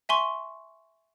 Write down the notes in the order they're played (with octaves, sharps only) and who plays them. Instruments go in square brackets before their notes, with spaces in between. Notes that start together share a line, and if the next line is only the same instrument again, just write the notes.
[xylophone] E5 G#5 C6 C#6